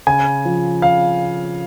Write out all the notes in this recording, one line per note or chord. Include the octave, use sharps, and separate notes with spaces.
C#3 G#5
F3
C#3 F5